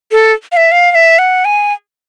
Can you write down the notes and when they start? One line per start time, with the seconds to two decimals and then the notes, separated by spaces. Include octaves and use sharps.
0.11 A4
0.52 F5
0.57 E5
0.72 F5
0.91 F5
0.95 E5
1.19 F#5
1.45 G#5